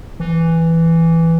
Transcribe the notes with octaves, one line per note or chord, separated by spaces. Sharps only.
E3